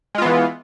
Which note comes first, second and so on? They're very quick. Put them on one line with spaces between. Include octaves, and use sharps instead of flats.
G#3 F4 B3 E3